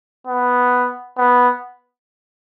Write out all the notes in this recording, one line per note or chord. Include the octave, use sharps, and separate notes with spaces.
B3
B3